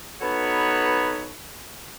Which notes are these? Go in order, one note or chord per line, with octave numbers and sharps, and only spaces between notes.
B3 D#4 F#4 A4 B4 C#5